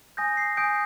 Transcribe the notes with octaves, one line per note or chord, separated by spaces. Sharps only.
G#5 D#6 G6 A#6
C7
G#5 D#6 G6 D7